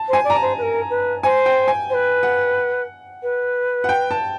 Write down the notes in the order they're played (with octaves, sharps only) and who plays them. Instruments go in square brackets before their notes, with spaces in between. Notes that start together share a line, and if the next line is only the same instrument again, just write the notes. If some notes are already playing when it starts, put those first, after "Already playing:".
Already playing: [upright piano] A5
[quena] C5 [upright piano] G#5
[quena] D5
[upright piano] A#5
A5
[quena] C5
B4
A#4
B4
[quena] C5 [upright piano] G#5
[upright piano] G5
G#5
[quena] C5
B4
[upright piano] F#5
[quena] B4
[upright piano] F#5
G5
A5